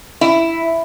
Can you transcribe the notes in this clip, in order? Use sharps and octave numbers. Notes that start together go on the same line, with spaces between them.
E4